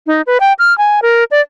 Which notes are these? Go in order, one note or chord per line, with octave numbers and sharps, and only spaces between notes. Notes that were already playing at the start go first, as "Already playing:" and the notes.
D#4
B4
G5
F6
G#5
A#4
D5